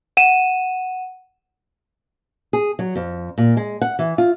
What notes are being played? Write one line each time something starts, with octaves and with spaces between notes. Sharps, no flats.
F#5 D#7 E7
G#4
F#3
F2
A#2
G#3
F#5
E3
F4